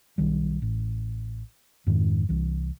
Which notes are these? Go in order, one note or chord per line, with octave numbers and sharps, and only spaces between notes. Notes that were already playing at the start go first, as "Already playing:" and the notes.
B1 D#3 G3
A1
F2 G#2 D#3
C2 E3